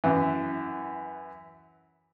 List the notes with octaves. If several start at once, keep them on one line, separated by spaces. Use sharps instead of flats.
F#2 E3